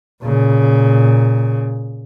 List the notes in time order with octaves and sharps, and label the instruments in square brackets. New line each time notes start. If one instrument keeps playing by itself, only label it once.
[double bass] A#2 C#3